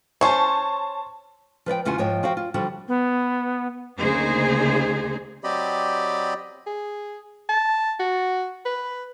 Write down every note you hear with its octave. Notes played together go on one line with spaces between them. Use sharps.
C#4 C5 A5 C6 C#6
F3 B4 D5 G5
E2 C#3 F4 F#4 F#5 G#5
G#2 F3 C#5 D#5 G5
F3 F#4 F5 G5
F4
D3 F3 G3 F#4
B3
D2 C#3 A#3 D#4 G#4 C5
F#3 C4 G4 D5 D#5 B5
G#4
A5
F#4
B4